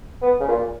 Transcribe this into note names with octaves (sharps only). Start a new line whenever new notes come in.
B3
C#3
A#2